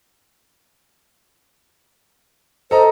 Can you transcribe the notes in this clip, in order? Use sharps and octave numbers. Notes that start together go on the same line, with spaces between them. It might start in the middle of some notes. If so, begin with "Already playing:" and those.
A4 C5 D#5 A#5